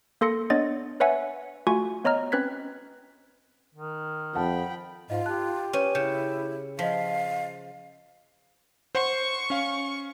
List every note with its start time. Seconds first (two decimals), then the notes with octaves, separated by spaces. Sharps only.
0.21 A#3 A4 C6 A#6 C#7
0.50 B3 D4 C#5 D#5 A6
1.00 B4 C#5 E5 F#5 G#5
1.67 A3 F4 F#4 G#5 C#6
2.04 B3 C#5 D#5 A#5 F6
2.32 C4 C#4 B4 F#6 G#6 B6
3.75 D#3
4.35 F2 F#5 G5 A5 B5
5.10 G#2 F4 D#5 F5
5.26 G4 A5 F#6
5.73 C#4 B4 C#5 D#7
5.95 C#3 E4 G6 C#7 E7
6.79 F3 D#5 F5 B6
8.95 C5 F#5 C6 C#6
9.50 C#4 F5